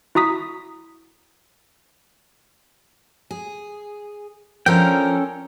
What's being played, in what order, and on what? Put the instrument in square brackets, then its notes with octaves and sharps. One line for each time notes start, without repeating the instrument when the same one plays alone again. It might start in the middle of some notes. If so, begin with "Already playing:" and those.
[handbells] E4 F#4 A#5 D#6 B6
[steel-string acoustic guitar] G#4
[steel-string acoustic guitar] F3 D4 A#4 [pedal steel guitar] C#4 A4 G5